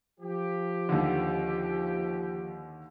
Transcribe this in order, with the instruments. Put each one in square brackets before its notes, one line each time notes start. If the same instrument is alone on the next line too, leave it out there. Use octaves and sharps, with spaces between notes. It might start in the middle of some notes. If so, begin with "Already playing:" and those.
[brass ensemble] F3 G4
[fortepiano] D#2 D3